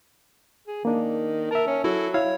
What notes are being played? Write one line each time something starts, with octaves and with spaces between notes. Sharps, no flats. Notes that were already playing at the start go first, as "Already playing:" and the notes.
G#4
D#3 A#3 D4
A#4 E5 A5
C#4
F#3 E4 F#4 A4
E4 C#5 F5